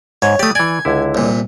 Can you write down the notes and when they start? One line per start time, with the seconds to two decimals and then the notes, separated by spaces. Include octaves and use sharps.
0.22 G#2 C#5
0.39 A3 G4 D5 D#6
0.55 E3 D5 G#5
0.85 C#2 D3 E4
1.15 C2 A#2